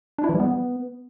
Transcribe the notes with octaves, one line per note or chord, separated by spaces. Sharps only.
D4
E4
E3
G3
B3